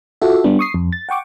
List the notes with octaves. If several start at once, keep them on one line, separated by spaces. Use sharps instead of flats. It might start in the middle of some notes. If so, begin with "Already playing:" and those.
F4 F#4 A4 E5
G3 B3 D4
C#6 D#6 C7
F2
A6
F#5 G5 C#6 D6